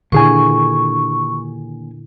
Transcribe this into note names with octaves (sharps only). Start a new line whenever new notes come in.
D#2 A#2 D3 E4 G#4 G#5 C#6